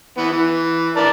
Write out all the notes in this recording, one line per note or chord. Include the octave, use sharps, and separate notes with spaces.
E3 B3
E3
A#4 D5 A5